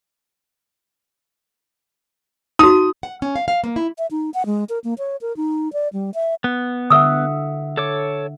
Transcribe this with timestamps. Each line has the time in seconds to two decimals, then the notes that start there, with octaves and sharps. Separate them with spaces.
2.59 D#4 F#4 D#6
3.03 F#5
3.22 C#4
3.36 F5
3.48 F5
3.64 A#3
3.76 E4
3.98 E5
4.11 D#4
4.34 F#5
4.46 G#3
4.69 A#4
4.84 A#3
4.98 C#5
5.21 A#4
5.37 D#4
5.73 D5
5.93 G3
6.14 E5
6.44 B3
6.90 D3 E5 F#5 D#6 E6
7.77 A4 C#5 D6